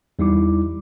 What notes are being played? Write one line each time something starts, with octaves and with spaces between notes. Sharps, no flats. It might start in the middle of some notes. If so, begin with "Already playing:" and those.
E2 G3 D#4 E4 D6